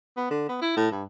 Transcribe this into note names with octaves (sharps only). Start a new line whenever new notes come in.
B3
D3
B3
E4
A2
G2